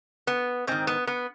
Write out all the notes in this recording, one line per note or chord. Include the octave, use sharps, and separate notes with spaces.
B3
G#2 D#3 C4
B3
B3